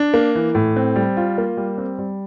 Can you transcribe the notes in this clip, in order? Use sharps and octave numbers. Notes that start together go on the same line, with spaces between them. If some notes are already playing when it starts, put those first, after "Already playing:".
Already playing: D4
A#3
E3
A2
C4
G3
F4
A#3
G3
C4
G3